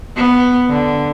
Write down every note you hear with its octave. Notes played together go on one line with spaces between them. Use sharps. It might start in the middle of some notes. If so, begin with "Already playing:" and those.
B3
D3